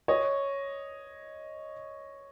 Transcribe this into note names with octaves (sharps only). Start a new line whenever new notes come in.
C#5 D#5